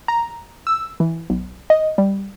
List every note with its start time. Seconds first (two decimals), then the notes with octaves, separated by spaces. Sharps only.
0.08 A#5
0.67 E6
1.00 E3
1.30 B1
1.70 D#5
1.98 G3